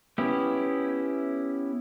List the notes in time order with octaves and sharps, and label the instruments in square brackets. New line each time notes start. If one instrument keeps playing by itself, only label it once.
[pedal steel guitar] B3 C#4 E4 G4